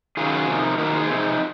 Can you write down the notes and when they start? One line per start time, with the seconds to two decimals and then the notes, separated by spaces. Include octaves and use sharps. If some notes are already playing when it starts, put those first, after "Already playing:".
0.17 D#3 F#3 C#4 F4 G#4
0.48 C3 F3 A#3 D#4
0.78 D#3 A#3 D#4 F#4 A#4
0.94 G#4 C5
1.09 C3 F3 C4 D#4